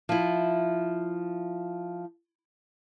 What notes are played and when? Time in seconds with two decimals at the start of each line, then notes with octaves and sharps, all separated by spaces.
0.09 F3 E4